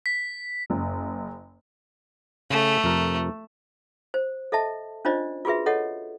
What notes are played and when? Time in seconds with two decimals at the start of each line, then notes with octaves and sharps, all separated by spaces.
0.06 B6
0.70 F#1
2.50 C#3 A3 G#4 A4
2.84 F2 C3 A#4
4.14 C5
4.52 A4 D#5 E5 A5
5.05 C#4 D4 F4 C5 D5 D#5
5.45 F4 F#4 G#4 B4 E5
5.66 A4 C#5 D#5 F#5